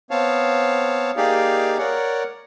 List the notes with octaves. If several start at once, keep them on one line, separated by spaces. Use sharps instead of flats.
B3 C4 C#5 F5 A5
A#3 D#4 G4 G#4 D5 F5
A#4 C#5 D5 F#5